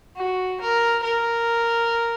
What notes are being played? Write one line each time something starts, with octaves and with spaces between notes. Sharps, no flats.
F#4
A#4
A#4